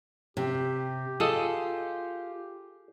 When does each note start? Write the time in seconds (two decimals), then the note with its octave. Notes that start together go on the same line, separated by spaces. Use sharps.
0.37 C3 G4
1.20 F4 G#4 A4 D#5